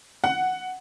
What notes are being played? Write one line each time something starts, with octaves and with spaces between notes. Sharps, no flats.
F#5